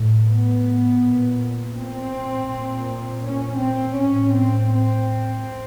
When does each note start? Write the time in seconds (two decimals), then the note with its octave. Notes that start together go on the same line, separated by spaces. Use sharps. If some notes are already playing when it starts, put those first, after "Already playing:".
Already playing: A2
0.25 B3
0.99 A#2
1.74 C4
2.49 A#2
3.23 C#4
3.60 C4
3.97 A2 C#4
4.34 C4
4.71 C4